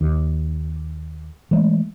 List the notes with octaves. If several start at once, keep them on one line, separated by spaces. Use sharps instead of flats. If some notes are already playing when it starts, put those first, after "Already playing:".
D#2
E3 G#3 A3